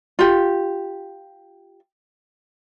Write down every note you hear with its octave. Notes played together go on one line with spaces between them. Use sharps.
F4 G4